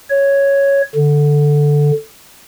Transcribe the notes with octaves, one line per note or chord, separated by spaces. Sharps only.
C#5
D3